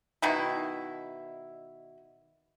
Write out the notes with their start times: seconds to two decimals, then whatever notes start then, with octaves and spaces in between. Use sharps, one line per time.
0.22 B2 D#3 E4